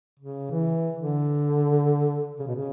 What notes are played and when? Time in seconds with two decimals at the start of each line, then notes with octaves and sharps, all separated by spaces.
0.20 C#3
0.51 E3
0.98 D3
2.39 C#3
2.47 B2
2.55 C#3